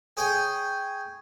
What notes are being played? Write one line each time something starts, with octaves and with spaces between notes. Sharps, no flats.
G#4 C#5 G5 G#5